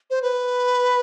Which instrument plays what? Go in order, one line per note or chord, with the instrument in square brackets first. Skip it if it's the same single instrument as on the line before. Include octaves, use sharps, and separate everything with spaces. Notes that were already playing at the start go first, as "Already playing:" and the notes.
[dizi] C5
B4